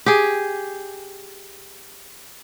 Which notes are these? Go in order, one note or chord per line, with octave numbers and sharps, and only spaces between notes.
G4 G#4